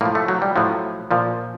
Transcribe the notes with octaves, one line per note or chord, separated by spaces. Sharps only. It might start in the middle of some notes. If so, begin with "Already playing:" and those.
A2 F3 A#3
A3
F#3
G3
A2 F3 F#3
A#2 F3